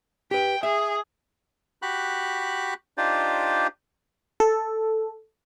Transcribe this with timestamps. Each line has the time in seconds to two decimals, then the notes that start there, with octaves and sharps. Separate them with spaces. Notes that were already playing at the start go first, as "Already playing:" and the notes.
0.31 G4 B4 G5
0.63 G#4 E5
1.82 F#4 G4 B5 F#6
2.98 D4 D#4 F4 G4 C5 D5
4.40 A4